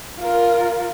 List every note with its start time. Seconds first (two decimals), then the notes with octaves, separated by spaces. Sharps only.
0.20 F4 A#4